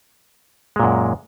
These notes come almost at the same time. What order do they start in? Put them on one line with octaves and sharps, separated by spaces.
G#3 A#2 F#2